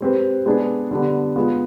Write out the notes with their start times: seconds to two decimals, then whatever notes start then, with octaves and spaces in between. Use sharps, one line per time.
0.01 G#3 C4 G4 B4
0.46 G#3 B3 D4 G#4 B4
0.91 D3 G3 B3 D4
1.36 G#3 B3 F4